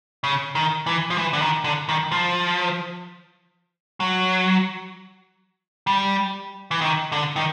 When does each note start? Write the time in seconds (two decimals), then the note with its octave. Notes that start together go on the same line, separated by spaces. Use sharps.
0.24 C#3
0.55 D#3
0.86 E3
1.10 F3
1.18 E3
1.33 D3
1.42 D#3
1.64 D3
1.89 D#3
2.12 F3
4.00 F#3
5.87 G3
6.71 E3
6.81 D#3
7.12 D3
7.36 D#3